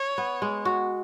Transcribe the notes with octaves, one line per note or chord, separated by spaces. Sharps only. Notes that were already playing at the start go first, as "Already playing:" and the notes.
Already playing: C#5
B3
G#3
F#4